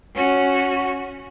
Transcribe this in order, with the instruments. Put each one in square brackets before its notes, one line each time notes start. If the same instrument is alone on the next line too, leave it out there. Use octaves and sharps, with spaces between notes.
[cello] C#4 F#4